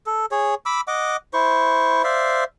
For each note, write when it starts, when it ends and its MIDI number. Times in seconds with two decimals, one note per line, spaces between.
0.06 0.26 69
0.31 0.55 68
0.31 0.55 73
0.66 0.81 83
0.66 0.81 86
0.66 0.81 88
0.88 1.17 75
0.88 1.17 78
0.88 1.17 86
1.34 2.02 64
1.34 2.02 72
1.34 2.02 85
2.04 2.44 72
2.04 2.44 74
2.04 2.44 76
2.04 2.44 77